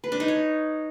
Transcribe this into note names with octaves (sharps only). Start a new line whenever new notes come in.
B4
D4
D#4
C#5